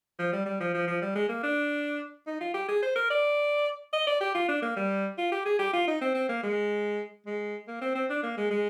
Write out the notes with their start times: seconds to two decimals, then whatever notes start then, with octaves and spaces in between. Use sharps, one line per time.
0.19 F3
0.33 G3
0.46 G3
0.60 F3
0.74 F3
0.87 F3
1.02 G3
1.15 G#3
1.29 A#3
1.43 D4
2.27 D#4
2.40 F4
2.54 G4
2.68 G#4
2.82 C5
2.95 A#4
3.10 D5
3.93 D#5
4.07 D5
4.21 G4
4.34 F4
4.48 D4
4.62 A#3
4.76 G3
5.18 F4
5.32 G4
5.45 G#4
5.59 G4
5.73 F4
5.88 D#4
6.01 C4
6.14 C4
6.29 A#3
6.43 G#3
7.26 G#3
7.68 A#3
7.81 C4
7.95 C4
8.10 D4
8.23 A#3
8.37 G#3
8.50 G#3